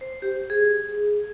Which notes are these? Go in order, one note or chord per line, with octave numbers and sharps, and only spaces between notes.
C5
G4
G#4